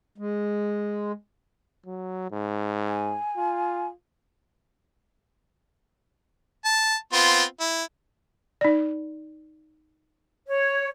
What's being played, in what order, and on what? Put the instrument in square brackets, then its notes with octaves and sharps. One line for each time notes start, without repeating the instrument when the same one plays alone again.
[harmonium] G#3
[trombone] F#3
G#2
[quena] G#5
[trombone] F4
[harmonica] A5
B3 C4 F4
E4
[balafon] D#4 D5
[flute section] C#5